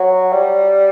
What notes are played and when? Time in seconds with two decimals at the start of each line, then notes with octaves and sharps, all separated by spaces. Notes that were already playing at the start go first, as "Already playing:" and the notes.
Already playing: F#3
0.32 G3